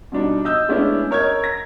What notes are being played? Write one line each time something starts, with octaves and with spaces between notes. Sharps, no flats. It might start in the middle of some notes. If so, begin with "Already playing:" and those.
B2 G3 D4 D#4
D#5 E6 G6
G#3 A3 B3 C#4 D4 E4
A#4 C#5 D#5 G#6
A#6